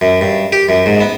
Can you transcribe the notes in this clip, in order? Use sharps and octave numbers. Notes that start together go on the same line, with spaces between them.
F#2
G2
G4
F#2
G#2
B3